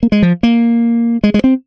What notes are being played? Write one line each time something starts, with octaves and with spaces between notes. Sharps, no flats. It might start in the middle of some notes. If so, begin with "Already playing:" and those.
A#3
G#3
F3
A#3
G#3
G#3
C4